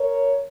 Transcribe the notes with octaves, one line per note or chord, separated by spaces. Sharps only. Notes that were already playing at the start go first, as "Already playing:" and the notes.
Already playing: A#4 C#5